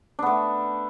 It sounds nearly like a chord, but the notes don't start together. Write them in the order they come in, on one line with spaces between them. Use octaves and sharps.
D4 B3 A3